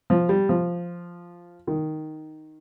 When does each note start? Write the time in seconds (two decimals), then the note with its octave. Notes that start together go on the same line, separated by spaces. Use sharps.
0.10 F3
0.29 G3
0.49 F3
1.67 D#3